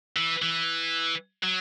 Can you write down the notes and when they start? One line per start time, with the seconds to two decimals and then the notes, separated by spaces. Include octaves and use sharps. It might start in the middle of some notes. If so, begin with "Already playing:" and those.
0.17 E3
0.42 E3
1.43 F#3